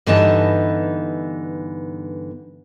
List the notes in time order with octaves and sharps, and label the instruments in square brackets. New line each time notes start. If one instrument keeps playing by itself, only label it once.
[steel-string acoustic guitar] G2 D3 E3 B3 D#4 A5